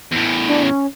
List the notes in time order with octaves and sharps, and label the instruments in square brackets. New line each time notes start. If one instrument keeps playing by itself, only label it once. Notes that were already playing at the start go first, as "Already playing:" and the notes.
[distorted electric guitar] E2 A2
[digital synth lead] D4
C#4